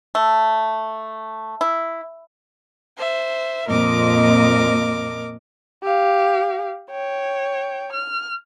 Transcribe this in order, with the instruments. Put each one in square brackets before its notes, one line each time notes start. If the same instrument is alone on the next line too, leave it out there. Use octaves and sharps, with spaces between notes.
[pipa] A3
E4
[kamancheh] C5 E5
[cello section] F2 A#2 D#5 [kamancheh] A#4 D6
[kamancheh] G4 F5
C#5 G5
F6